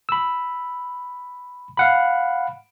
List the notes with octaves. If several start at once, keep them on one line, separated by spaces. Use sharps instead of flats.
B5 E6
F5 F#5 B5